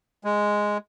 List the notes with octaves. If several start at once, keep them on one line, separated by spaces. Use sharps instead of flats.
G#3